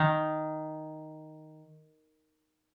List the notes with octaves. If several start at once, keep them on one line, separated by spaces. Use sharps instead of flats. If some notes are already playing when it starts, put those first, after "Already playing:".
Already playing: D#3